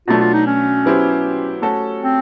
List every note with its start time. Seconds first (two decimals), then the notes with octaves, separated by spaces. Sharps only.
0.08 B2 F#3 A3 D4 F4
0.20 F4
0.34 D#4
0.47 C#4
0.85 F#3 B3 E4 G4 C5
1.62 A3 C#4 F#4 A4
2.01 C4